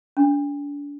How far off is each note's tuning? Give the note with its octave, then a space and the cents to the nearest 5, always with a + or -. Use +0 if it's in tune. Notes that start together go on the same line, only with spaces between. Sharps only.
D4 -35